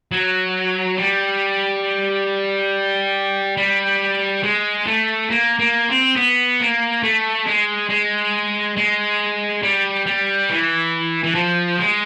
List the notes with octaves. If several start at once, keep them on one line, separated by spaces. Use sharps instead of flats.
F#3
G3
G3
G#3
A3
A#3
A#3
C4
B3
A#3
A3
G#3
G#3
G#3
G3
G3
E3
E3
F3
G#3